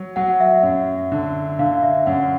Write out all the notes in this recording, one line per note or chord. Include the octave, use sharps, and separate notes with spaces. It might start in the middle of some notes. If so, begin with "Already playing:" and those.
Already playing: F#3
F#3 F#5
E5
F#2
D3
D3 F5
E5
F#2 F#5